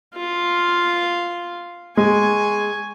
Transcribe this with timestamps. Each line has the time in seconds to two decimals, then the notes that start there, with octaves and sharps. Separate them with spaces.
0.15 F4 F5
1.97 G#3 G#5 C#6